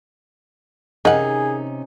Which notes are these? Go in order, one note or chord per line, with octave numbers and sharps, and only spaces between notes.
C3 D#3 C#4 D#4 G#4 D#5 F#5